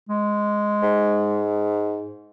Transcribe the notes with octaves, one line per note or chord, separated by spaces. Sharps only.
G#3
G#2